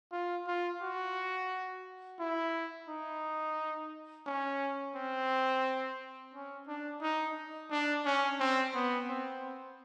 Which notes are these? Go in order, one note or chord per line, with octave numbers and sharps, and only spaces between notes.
F4
F4
F#4
E4
D#4
C#4
C4
C#4
D4
D#4
D4
C#4
C4
B3
C4